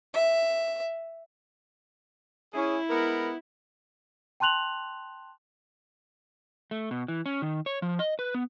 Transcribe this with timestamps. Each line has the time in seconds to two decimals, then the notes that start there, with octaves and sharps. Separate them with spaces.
0.14 E5
2.54 C#4 E4 G#4
2.90 G#3 B3 A#4
4.40 G5 A5 C6 F#6 F7 F#7
6.71 A3
6.91 B2
7.08 E3
7.26 C#4
7.42 D#3
7.66 C#5
7.82 F3
7.99 D#5
8.19 B4
8.34 B3